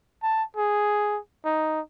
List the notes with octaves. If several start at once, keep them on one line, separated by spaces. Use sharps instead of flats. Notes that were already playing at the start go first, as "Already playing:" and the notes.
A5
G#4
D#4